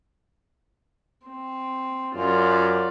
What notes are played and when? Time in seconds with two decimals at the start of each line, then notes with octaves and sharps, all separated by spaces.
1.27 C4
2.15 F#2 F4 D5